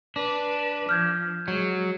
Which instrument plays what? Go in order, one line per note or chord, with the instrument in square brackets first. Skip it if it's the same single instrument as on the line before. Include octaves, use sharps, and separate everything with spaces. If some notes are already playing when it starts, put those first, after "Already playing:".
[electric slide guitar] D4 [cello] B4
[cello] F3 [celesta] F6 G6 G#6
[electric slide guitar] F#3 [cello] G#3